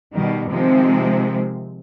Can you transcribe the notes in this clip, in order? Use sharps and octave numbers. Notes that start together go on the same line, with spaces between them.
B2 D#3 G3
C3 D#3 F3 G#3 C4